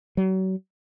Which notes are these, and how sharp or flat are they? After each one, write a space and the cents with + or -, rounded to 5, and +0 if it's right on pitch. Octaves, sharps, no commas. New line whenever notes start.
F#3 +35